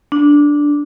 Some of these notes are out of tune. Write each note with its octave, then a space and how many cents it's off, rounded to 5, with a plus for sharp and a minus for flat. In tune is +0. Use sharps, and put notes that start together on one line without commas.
D4 -5